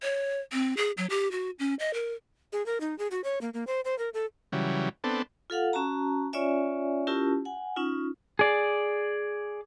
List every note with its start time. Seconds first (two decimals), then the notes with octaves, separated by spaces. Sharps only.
0.02 C#5
0.52 C4
0.77 G#4
0.97 F#3
1.10 G4
1.31 F#4
1.59 C#4
1.79 D#5
1.94 A#4
2.53 G#4
2.66 A#4
2.81 D#4
2.99 G#4
3.11 F#4
3.24 C#5
3.41 A#3
3.54 A#3
3.67 C5
3.85 C5
3.99 A#4
4.14 A4
4.52 C#3 E3 F#3 G3
5.04 B3 C4 D4 A4
5.50 F4 A4 F5 F#5
5.73 C#4 F#4 A5 A#5
6.33 C#4 F4 C#5 D5 E5 G#5
7.07 C#4 E4 F4 G4 A#4 A5
7.45 F#5 G#5
7.76 C#4 D#4 F4
8.39 G#4 D5